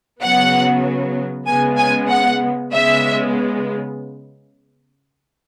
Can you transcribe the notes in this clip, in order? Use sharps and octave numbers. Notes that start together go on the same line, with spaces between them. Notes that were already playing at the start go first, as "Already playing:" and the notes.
C#3 F#3 B3 F#5
C#3 G#3 B3 G#5
G#5
F#5
C#3 G#3 B3 E5